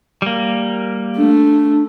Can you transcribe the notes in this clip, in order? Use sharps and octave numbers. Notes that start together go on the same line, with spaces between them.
G3 A#3
A3 D4